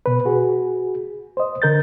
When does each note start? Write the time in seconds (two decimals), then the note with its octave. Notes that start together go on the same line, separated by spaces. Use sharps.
0.06 B2 B4
0.25 F#4 G#4
1.37 C5 D#5
1.62 D3 A#4 G6 A6